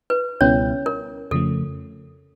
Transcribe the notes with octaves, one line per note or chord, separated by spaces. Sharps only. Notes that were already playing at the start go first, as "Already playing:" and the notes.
B4
C#2 B2 G3 B3 C#4 E4 C#5
A#4
F2 C#3 F3 A3 A4